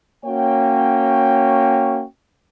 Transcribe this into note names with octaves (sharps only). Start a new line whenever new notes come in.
A#3 C#4 F#4 C#5 G5